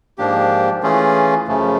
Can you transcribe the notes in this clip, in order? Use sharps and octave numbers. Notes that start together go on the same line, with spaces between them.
G#2 F3 A#3 D4 G4
E3 A3 C#4 F4 G#4
F#2 C#3 F3 A3